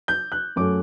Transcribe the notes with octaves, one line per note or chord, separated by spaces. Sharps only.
G6
F#6
F#2 F#3 A3 D6